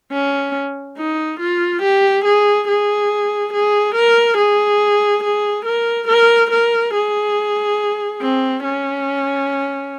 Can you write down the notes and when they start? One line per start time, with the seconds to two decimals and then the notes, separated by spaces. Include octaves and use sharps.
0.12 C#4
0.97 D#4
1.40 F4
1.82 G4
2.25 G#4
2.68 G#4
3.53 G#4
3.95 A#4
4.38 G#4
5.24 G#4
5.65 A#4
6.08 A#4
6.51 A#4
6.94 G#4
8.21 C4
8.64 C#4